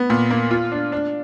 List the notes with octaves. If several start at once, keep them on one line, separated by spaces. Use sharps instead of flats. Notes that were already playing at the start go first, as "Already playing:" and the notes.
Already playing: B3
A#2
A#3
F4
D4
D4